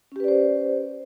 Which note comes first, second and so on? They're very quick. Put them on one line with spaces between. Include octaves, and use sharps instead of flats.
C#4 G4 B4 D5 C5